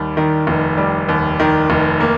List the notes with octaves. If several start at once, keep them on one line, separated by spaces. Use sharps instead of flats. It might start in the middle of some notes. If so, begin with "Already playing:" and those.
Already playing: D#2 G3
D#3
F1
G3
D#2
D#3
F1
A#3